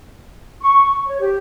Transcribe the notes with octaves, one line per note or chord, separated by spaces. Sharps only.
C#6
C#5
G4